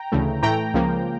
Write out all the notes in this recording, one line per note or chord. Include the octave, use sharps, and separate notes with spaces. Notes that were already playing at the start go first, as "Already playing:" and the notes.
Already playing: G5 A#5
D2 C#3 E3 A3
A2 E3 A3 G5 A#5
C#2 C#3 F3 A#3